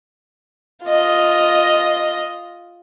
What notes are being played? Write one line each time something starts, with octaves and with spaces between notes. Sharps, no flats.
F4 D#5